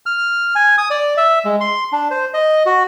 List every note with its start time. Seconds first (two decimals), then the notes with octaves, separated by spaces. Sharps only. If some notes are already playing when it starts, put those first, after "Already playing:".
0.06 F6
0.55 G#5
0.78 D#6
0.90 D5
1.17 E5
1.45 G#3
1.60 C6
1.92 D4
2.11 C5
2.34 D#5
2.66 F#4